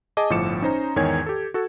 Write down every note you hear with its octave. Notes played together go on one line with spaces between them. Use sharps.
G#4 D#5 G#5 A5 D6
G1 A2 F3 D6 C#7 E7
C#4 D#4 C5 A#5
E2 G#2 D#3 C#5 G#5 G#6
G4 A4
F#4 A4